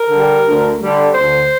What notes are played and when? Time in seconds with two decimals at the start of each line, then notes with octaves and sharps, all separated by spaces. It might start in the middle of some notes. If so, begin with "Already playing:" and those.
Already playing: A#4
0.10 D3 G3
0.45 D2
0.80 D3 G3
1.15 D2 C5